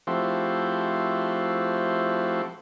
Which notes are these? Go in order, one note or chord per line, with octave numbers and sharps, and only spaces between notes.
F3 A3 C4 E4 F#4 G4